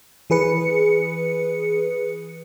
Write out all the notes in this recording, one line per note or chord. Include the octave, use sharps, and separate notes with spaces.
E3 G#4 B4 C#7